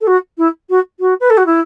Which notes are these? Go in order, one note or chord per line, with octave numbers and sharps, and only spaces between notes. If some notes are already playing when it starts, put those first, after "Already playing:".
A4
F#4
E4
F#4
F#4
B4
A4
F#4
E4